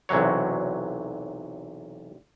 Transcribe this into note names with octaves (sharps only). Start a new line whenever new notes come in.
B1 E2 C3 F#3 C#5